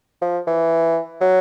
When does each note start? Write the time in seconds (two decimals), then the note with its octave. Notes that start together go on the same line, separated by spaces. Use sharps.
0.21 F3
0.47 E3
1.21 F#3